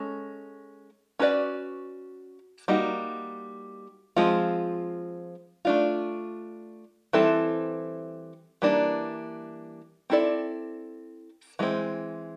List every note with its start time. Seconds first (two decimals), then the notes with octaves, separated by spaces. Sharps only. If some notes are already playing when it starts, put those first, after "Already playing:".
Already playing: G#3 C#4 A4
1.19 C#4 F#4 B4 D5
2.68 G3 A#3 D#4 F#4
4.16 F3 G#3 C4 F4
5.65 A3 D4 F4
7.13 E3 G3 C4 E4 A4
8.62 E3 G3 A#3 D4
10.10 C4 E4 A4 D5
11.59 E3 G#3 C4